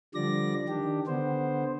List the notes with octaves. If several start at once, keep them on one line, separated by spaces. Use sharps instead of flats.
D3 F3 G3 D5 A#6
D#3 D4 G4
D3 B3 C5